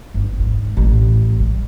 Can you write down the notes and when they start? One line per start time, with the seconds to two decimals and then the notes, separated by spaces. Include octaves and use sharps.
0.14 G1
0.40 G#2
0.77 A1
1.40 G3